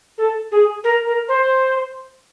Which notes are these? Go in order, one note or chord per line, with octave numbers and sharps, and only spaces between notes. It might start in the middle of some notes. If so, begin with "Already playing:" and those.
A4
G#4
A#4
A#4
C5